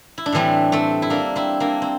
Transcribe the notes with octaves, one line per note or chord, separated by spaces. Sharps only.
E4
D4
A2 E3 G3 A3 C4
A3 C4
E4
A#3 D4
C4 E4
A#3 D4
C4